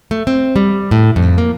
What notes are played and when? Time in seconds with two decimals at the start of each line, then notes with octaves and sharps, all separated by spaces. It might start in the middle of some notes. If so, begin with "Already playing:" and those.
0.11 A3
0.27 C4
0.56 G3
0.91 A2
1.16 F2
1.38 A#3